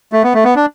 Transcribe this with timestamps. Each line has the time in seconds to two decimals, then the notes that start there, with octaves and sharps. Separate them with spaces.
0.13 A3
0.24 B3
0.34 A3
0.45 B3
0.56 D4